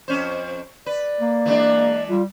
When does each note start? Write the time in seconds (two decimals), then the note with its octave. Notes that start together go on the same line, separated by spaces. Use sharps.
0.08 F2 C#4 C5
0.86 B4 D5
1.21 A#3
1.46 E3 G#3 D4
2.09 G3 F4